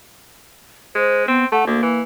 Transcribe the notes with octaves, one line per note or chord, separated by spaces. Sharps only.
G#3 C5
B3 C4
A3 F#5
D2 A#3
E3